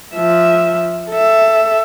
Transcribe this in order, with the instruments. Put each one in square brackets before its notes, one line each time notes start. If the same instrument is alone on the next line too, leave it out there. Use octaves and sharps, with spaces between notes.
[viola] F3 E5
A4 E5